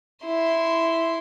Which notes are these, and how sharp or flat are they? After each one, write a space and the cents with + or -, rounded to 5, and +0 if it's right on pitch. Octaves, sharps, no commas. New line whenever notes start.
E4 +0 C6 -15